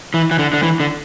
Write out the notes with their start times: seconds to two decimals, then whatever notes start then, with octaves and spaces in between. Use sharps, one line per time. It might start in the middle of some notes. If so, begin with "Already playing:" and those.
0.14 E3
0.31 E3
0.39 D3
0.53 D3
0.63 E3
0.80 D3